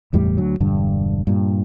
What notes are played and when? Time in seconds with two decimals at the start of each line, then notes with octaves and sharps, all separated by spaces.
0.13 F#1 E2 A2 G3
0.37 D2 F#3
0.60 E1 G2 D3
1.27 G2 A#2